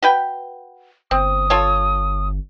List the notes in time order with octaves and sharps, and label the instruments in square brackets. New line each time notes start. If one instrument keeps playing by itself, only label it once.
[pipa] F#4 B4 G5
[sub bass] G1 [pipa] C4 [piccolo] D#6
[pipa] F4 A4 C#5